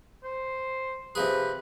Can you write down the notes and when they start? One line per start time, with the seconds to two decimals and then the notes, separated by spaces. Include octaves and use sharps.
0.24 C5
1.15 C3 F3 G#4 B4